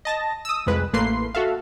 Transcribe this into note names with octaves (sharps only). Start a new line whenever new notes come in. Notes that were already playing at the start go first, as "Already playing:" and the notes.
D#5 A5 A#6
D#6 E6
C2 F2 G#3 B4
A1 A3 A#3 B4 C6 C7
F#4 A4 E5 F5